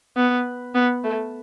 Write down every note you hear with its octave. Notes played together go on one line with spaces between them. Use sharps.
B3
B3
A3